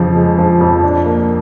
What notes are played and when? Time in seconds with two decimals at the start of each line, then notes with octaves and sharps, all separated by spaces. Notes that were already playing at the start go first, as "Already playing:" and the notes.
Already playing: F2 C#3 F3
0.16 G#3
0.38 F3
0.61 F2
0.83 D4
1.06 A#3